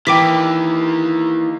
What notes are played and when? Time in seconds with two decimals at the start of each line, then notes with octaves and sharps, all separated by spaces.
0.07 D#3 E3 A#3 G5 D6 B6